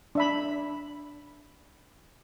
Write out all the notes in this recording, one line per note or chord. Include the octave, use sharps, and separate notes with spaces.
D4 E5 B5